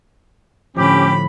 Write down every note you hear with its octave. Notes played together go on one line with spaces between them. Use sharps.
A2 D3 F3 C#4 G4 B5 D6